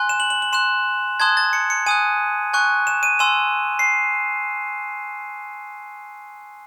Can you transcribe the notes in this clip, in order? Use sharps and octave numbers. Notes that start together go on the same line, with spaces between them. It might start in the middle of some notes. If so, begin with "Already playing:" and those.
Already playing: G#5 C6 F#6
E7
F#7
F#7
F#7
C6 F#6 E7
A5 C6 D#6 F#6 G#6
A6
C#7
C#7
G#5 D#6 F#6 D#7
G#5 C#6 F#6
E7
D#7
G#5 C6 E6 E7
C7